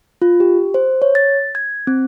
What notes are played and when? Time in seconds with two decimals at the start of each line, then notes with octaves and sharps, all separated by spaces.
0.22 F4
0.40 G4
0.74 C5
1.02 C#5
1.15 A6
1.55 G#6
1.87 C4